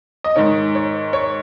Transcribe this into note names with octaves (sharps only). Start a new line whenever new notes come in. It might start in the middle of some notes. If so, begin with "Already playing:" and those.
D#5
G#2 D#3 C#5
C#5
C#5